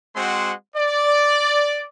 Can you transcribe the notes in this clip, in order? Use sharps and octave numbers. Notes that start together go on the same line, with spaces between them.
G#3 C4 F#4 C5 F#5 C6
D5